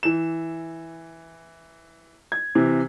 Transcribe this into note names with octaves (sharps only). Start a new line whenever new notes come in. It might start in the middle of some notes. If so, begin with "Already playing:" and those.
E3 E7
G#6
C3 E3